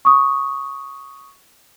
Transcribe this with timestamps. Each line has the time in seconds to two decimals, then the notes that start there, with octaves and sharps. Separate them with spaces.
0.05 C#6 D#6